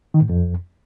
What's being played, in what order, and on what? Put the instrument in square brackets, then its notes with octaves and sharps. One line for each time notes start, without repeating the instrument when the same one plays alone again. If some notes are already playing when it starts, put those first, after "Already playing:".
[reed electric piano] D#3
A2
F2